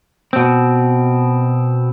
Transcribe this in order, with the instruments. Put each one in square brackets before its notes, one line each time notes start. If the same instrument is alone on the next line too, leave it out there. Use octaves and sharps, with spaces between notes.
[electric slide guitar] B2 C4